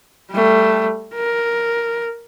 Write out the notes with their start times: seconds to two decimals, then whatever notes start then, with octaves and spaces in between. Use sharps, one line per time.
0.31 G3 A3
1.15 A#4